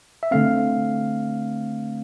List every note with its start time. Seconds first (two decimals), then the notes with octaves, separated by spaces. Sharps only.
0.23 E5
0.31 D3 A3 C4 F5